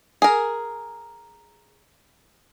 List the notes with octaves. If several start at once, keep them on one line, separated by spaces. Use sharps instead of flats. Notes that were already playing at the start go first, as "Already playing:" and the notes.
G#4 A#4